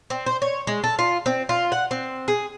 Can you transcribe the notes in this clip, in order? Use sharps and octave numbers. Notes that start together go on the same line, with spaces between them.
C4
C5
C#5
G#3
A4
F4
C4
F4
F#5
C4
G#4